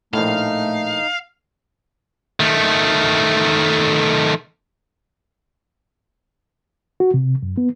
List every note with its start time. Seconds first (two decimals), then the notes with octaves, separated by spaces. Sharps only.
0.13 A#1 A2 A3 D#4 F5
2.40 D#3 A3
7.00 F#4
7.14 C3
7.43 F#2
7.57 B3